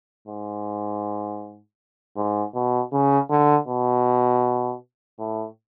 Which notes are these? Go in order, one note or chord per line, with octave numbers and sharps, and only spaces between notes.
G#2
G#2
B2
C#3
D3
B2
A2